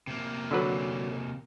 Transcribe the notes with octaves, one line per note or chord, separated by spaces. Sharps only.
C3 A#3
D3 F#3 B4